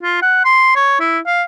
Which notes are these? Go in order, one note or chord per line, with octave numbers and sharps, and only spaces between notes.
F4
F#5
C6
C#5
E4
F5